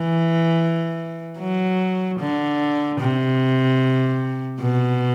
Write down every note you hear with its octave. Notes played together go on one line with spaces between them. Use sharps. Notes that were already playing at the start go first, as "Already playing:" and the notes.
Already playing: E3
F#3
D3
C3
B2